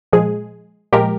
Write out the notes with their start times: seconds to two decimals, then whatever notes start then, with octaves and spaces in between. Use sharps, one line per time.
0.13 A#2 F3 G#3 G#4
0.92 A#2 F3 G#3 G4 A#4